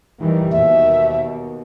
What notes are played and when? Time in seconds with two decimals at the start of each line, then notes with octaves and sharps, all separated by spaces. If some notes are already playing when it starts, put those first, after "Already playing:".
0.19 D#3 E3 G3
0.52 D#2 B2 E5